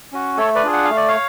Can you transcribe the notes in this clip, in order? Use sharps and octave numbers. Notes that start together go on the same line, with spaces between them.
C#4 F#4
A3 A4 C#5
B4 D5
D4 F4 G#4
F#5
F5
A3
D5
C#5 F5